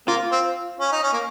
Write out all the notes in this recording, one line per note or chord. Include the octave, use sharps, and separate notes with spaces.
A#3 F4
C4
C#4
D#4
C#4
A#3